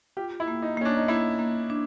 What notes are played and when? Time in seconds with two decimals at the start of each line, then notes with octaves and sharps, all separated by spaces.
0.17 F4 G4
0.40 E4
0.48 A#3
0.62 D#4
0.77 A#3 C#4
0.85 D4
0.97 D#4
1.08 A#3 E4
1.39 A#3
1.70 D4